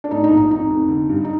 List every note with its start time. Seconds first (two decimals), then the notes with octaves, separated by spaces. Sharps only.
0.04 D4
0.11 A2 D#4
0.24 D#4
0.30 A#1
0.37 D#4
0.51 F2 D#4
0.70 F1
0.89 D3
1.09 G2
1.24 D#4